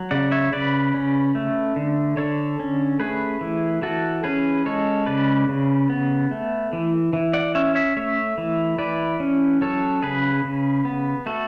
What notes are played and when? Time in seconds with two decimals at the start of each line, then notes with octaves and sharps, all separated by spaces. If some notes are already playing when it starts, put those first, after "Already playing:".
Already playing: F#3
0.11 C#3 D5 F#5
0.32 C#5 E5
0.52 C#3 B4 D5
0.94 C#4
1.35 A3
1.76 D3
2.17 D3 A4 C#5
2.59 C#4
3.00 A3 G#4 B4
3.41 E3
3.82 E3 F#4 A4
4.24 C#4 G#4 B4
4.65 G#3 A4 C#5
5.06 C#3 B4 D5
5.48 C#3
5.90 B3
6.31 A3
6.73 E3
7.13 E3
7.33 D5 F#5
7.55 C#4 C#5 E5
7.75 C#5 E5
7.97 A3 C#5 E5
8.38 E3
8.78 E3 B4 D5
9.20 C#4
9.61 F#3 A4 C#5
10.02 C#3 G#4 B4
10.44 C#3
10.85 B3
11.26 A3 F#4 A4